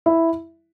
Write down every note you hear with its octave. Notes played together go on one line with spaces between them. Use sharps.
E4 E5